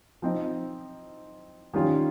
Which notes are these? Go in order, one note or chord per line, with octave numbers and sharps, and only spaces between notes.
F3 C4 D#4
D#3 G3 C#4 F4